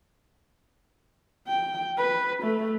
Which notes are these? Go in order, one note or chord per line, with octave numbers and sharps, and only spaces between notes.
G5
B4
A3